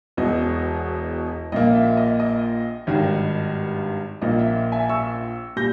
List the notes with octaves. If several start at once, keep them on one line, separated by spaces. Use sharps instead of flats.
E1 E2 B2 D#5
A#1 A#2 A#3 D#5
E5
D#5
D#5
G#1 G2 D#3
A#1 A#2 A#3 D#5
E5
E5 G#5
C#6 E6
A#2 G3 G6 A#6